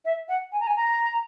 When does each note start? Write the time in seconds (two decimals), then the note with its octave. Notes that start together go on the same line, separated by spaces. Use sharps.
0.05 E5
0.28 F#5
0.52 G#5
0.60 A#5
0.67 G#5
0.76 A#5